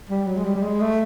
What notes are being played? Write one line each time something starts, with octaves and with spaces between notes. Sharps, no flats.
G3
F#3
G#3
G3
G3
G#3
A3